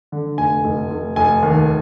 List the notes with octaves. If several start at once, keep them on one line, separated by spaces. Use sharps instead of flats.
D3
F1 G#5
F1
F1
F1 G#5
D#2